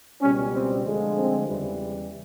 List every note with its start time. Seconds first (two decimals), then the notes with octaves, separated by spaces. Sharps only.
0.22 C#2 B2 G3 C#4
0.53 C4
0.85 D2 D3 F3 G#3
1.16 C4
1.47 E2 C#3 E3 G3